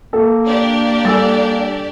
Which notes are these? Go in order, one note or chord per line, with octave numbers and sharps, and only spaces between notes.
A#3 A4
D4 G4 D5
G3 A4 G#5 E6 A6